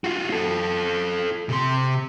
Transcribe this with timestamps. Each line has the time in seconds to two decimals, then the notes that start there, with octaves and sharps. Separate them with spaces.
0.04 F4 F#4
0.30 F4 A4
1.49 C3 C6